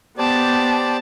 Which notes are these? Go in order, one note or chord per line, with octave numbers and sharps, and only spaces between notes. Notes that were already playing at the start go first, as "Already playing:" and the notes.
B3 G4 C5 D5 A5